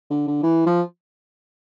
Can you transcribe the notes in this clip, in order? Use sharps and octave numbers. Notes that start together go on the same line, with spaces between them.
D3
D3
E3
F3